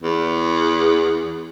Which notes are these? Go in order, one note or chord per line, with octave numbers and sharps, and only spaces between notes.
E2